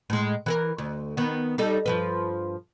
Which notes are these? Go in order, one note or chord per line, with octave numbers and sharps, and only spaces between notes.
A2 G#3
E3 A4 A#4
D2
D#3 B3
G3 D#4 A4
G2 F3 B4